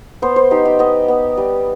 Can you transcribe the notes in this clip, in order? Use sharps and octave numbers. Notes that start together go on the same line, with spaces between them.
B3 C5
C5
D#4 G4
G4
B3 D#5
B3
G3